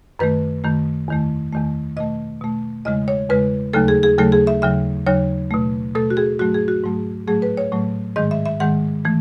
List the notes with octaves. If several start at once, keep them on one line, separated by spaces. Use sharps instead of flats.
F#2 D#3 A3 B4
F#2 D#3 A3
E2 D#3 A3
E2 D#3 A3
B2 A3 D#5
B2 A3
E2 C#3 G#3 D#5
C#5
E2 C#3 G#3 B4
D#2 C#3 F#3 A3 A4
G#4
G#4
D#2 C#3 F#3 A3 A4
G#4
E5
D#2 C#3 F#3 E5
D#2 C#3 F#3 C#5
B2 A3
B2 A3 A4
F#4
G#4
G#2 F#3 A3 F#4
G#4
F#4
G#2 F#3 A3
A2 F#3 A3 G#4
B4
C#5
A2 F#3 A3
G#2 D#3 G#3 D#5
E5
E5
G#2 D#3 G#3 F#5
E3 A3